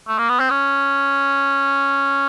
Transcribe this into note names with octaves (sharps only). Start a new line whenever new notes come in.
A3
A#3
B3
C4
C#4